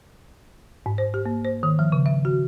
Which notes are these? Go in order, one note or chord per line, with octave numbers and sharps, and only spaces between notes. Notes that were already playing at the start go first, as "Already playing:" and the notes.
G#2
C5
G4
A#3
C5
D#3
F3
C#3
E5
F#4